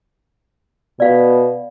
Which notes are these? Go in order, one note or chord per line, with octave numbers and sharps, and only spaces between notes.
B2 D5 F5